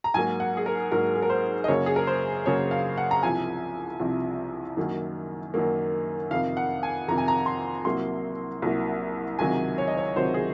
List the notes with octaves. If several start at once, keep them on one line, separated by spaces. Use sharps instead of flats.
A#5
G#2 F#3 A#3 G#5
F#5
G#4
A#4
G#2 F#3 A#3 A#4
G#4
A#4
C5
D#5
F#2 C#3 F#3 A#3 C#5
G#4
A#4
C5
F#2 C#3 F#3 A#3 C#5
F5
F#5
A#5
C2 C3 F3 G#5
C2 C3 F3
F#2 D#3 F#3 A#3
F#2 D#3 F#3 A#3
F2 C3 D#3 F5
F#5
G#5
F2 C3 D#3 A#5
G#5
A#5
C6
C2 C3 F#3 A#3 C6
C2 C3 F#3 A#3
C#2 C3 D#3 F#3 G#5
C#5
D#5
C#5
C#2 C3 D#3 F#3 C5
G#4